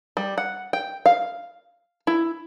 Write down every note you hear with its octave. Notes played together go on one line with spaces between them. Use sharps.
G3
F#5
G5
F5
E4